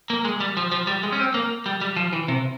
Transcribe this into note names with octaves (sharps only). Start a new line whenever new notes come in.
A#3
G#3
G3
F3
F3
G3
G#3
C#4
C4
A#3
G3
G3
F3
E3
C3